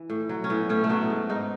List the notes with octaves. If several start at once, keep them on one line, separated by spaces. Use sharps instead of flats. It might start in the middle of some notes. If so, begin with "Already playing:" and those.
Already playing: E3
A2
F#3
C#4
A2 B3
A2 C#4
A3
F#3 B3
G#2
G#2 D#4